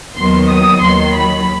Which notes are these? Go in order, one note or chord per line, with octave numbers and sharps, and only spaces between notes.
D#2 D#3 F#3 B3 C6
D#6
D#2 D#3 F#3 C6
B5